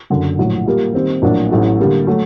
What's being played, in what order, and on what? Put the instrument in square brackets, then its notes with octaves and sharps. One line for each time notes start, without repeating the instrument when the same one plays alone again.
[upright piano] F#1 F#2 D3
A#1 A2 F#3
A#2 G3 A#3
D#3 G3 C4
A#1 A2 F#3 A#3 D4
A1 A2 F#3 A3
D3 G3 A#3
F#3 A3